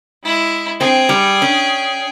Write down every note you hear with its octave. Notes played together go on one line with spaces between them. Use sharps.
G#3 E4
C4 G#4 G5
G3
C#4